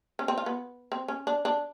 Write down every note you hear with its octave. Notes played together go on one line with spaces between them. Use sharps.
C#4
C4
F4
B3
C4
C#4
D4
D4